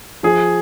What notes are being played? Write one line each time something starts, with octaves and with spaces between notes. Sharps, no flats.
F3 G#4